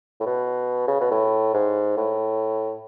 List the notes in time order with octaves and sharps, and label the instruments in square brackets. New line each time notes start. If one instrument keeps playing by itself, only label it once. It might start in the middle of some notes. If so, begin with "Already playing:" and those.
[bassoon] A2
B2
C#3
B2
A2
G#2
A2